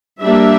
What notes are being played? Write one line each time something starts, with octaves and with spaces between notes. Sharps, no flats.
G3 A#3 D4 E5